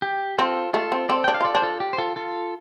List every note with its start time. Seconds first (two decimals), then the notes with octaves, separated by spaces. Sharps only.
0.02 G4
0.38 C4 F4 A4
0.73 A3 F4 A4
0.92 C4
1.09 C4 A4 D5
1.24 D4 G5
1.34 F5
1.41 F4 A4 D5
1.55 D4 C5
1.62 F4 A4
1.80 G4
1.93 C5
1.98 F4 A4
2.16 F4 A4